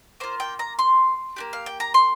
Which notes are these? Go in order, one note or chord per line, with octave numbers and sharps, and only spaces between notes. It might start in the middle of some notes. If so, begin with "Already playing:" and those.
A#3 F4 C5
G5
A#5
C6
A#3 D4 G4
F5
G5
A#5
C6